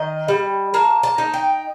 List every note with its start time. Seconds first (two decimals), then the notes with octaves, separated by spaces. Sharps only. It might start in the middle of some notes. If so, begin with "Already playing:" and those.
Already playing: D#3 D#5
0.28 G3
0.74 A#3 A5
1.03 A5
1.18 D#4
1.34 G5